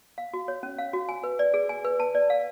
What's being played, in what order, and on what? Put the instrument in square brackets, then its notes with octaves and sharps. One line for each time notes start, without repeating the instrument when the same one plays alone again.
[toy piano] F5
F#4
C#5
C#4
F5
F#4
G#5
B4
D5
G#4
G#5
B4
A5
D5
F5